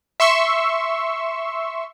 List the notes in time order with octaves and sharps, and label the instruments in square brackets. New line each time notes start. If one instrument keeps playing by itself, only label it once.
[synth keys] E5 C6 C#6 E6